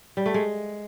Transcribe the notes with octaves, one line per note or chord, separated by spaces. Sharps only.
G3
A3
G#3